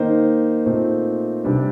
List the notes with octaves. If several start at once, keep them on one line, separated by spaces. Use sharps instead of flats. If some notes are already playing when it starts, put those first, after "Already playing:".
Already playing: D#3 A#3 D#4 C5
A#2 A3 C4 D#4
C3 G3 D4